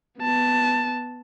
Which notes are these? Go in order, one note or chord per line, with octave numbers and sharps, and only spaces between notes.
B3 A5